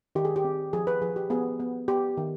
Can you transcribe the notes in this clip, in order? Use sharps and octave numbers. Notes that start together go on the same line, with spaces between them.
D#3 G4
G#4
G4
C4
F3 G#4
B4
F3 G#4
G4
B3 G#4
B3
B3 G4
D#3